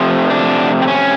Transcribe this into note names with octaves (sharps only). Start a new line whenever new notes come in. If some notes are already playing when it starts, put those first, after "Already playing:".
Already playing: C3 F3 A3
D4
C4
C#4